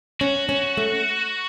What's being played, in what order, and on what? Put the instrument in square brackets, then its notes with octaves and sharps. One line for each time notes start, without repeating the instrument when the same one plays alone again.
[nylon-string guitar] C#4 [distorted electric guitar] F#4
[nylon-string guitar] C#4
A3